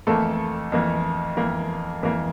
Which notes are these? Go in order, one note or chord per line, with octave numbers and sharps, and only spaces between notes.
F2 E3 A3 A#3 A4
F2 E3 A#3
F2 E3 A#3
F2 E3 A#3